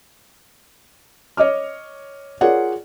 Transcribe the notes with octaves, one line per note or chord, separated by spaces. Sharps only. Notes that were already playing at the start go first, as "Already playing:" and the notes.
C#5 D#5 D6 F6
F4 G#4 A#4 C#5 D5 F#5